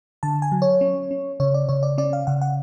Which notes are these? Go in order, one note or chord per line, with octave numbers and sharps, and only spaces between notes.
D3 A5
G#5
F#3
C#5
C#4
C#4
C#3 C#5
D5
C#3 C#5
D5
C#4 D5
F5
C#3 F#5
F#5